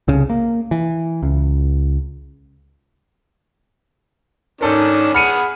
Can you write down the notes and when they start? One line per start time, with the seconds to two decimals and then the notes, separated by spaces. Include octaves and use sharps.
0.08 C2 C#3
0.30 A#3
0.71 E3
1.22 C#2
4.61 G#2 D#3 C#4 D4 A4 A#4
5.14 G#4 F#5 B5 F6 C#7 D#7